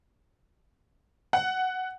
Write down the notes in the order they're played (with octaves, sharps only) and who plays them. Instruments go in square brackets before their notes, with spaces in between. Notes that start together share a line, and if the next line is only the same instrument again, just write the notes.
[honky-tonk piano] F#5